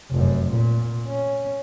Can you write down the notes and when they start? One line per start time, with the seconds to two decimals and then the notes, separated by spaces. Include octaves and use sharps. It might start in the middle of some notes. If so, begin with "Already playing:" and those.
0.11 F1 F#2
0.51 A#2
1.07 C#4